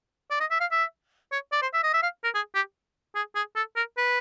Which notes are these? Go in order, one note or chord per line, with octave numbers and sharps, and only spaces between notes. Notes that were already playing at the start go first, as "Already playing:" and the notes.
D5
D#5
E5
F5
E5
C#5
D5
C5
E5
D#5
E5
F5
A#4
G#4
G4
G#4
G#4
A4
A#4
B4